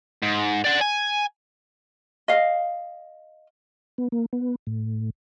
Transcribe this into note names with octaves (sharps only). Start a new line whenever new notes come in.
G#2
D5 F#5
G#5
D#5 F5
B3
A#3
B3
A2